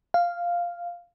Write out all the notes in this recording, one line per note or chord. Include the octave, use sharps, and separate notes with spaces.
F5